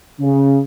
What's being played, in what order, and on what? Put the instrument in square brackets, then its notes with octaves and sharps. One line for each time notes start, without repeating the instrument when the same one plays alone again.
[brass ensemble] C#3